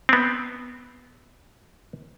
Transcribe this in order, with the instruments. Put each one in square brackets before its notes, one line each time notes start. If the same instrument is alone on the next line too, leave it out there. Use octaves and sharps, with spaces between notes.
[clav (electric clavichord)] B3 C4